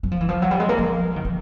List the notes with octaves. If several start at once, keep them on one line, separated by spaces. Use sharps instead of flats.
F#3
F3
E3
F3
F#3
G3
G#3
A#3
F3
D#3
E3